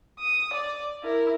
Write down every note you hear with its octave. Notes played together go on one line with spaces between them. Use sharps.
D#6
D5
E4 A#4